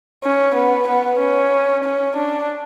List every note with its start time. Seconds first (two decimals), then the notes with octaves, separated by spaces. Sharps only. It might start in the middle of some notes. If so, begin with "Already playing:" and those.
0.24 C#4
0.55 B3
0.88 B3
1.20 C#4
1.84 C#4
2.17 D4